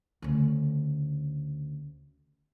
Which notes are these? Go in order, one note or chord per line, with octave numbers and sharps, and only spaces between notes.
D2 C#3